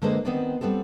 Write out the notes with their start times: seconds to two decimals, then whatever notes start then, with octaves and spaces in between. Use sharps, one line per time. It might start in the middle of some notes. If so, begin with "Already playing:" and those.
0.02 D3 G#3 A#3 G#4 B4 C5
0.25 D#3 B3 C4 B4 D5
0.61 G3 B3 C4 G4 A4